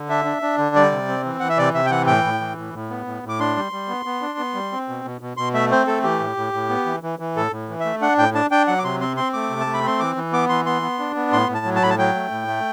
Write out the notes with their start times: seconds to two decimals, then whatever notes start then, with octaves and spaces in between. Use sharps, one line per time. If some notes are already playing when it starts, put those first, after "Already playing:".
Already playing: D3
0.09 D4 E5
0.25 D4
0.42 D4
0.58 D3
0.75 G3 D5
0.92 C3
1.08 C4
1.25 E3
1.40 E3 F#5
1.49 E5
1.58 C3 D5
1.74 C3 E5
1.86 G5
1.91 E3 F#5
2.07 A2 G5
2.24 A2
2.40 E3
2.57 A2
2.74 A2
2.90 B3
3.06 A2
3.23 A2
3.29 D6
3.40 D4 C6
3.56 G3
3.72 G3
3.88 B3
4.06 B3
4.21 D4
4.39 B3
4.54 G3
4.72 C4
4.89 B2
5.05 B2
5.21 B2
5.37 B2 C6
5.54 A3 E5
5.71 C4 C5
5.87 A3 A4
6.04 E3 G4
6.20 A2
6.37 A2
6.53 A2
6.70 B3
6.86 E3
7.03 E3
7.19 E3
7.36 A2 A4
7.52 A2
7.69 E3
7.80 E5
7.85 A3
8.02 D4 F#5
8.18 A2 G5
8.35 D4 A5
8.51 D4 G5
8.67 F#3 F#5
8.79 D6
8.84 C3 C6
9.01 C4 C6
9.17 C4 C6
9.33 A3 D6
9.50 C3
9.60 A5
9.66 A3
9.74 B5
9.83 C4 C6
10.00 E3 D6
10.17 E3
10.32 B3 D6
10.49 E3 C6
10.66 B3 C6
10.82 B3
10.99 D4
11.15 B3
11.32 A2 C6
11.49 A2
11.54 A5
11.65 F#3
11.76 A5
11.82 A2 B5
11.90 A5
11.98 F#3 G5
12.15 A3
12.31 A2
12.48 A3